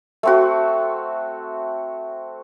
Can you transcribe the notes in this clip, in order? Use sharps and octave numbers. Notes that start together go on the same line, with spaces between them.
A3 C4 F#4